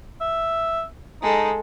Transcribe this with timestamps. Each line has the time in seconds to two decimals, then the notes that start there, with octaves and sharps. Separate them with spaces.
0.21 E5
1.22 G#3 D#4 A4